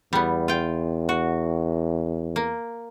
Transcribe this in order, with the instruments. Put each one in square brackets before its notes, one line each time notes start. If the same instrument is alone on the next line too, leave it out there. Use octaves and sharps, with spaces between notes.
[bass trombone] E2 [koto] G3 B3
[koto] F4 G5
F#4
A#3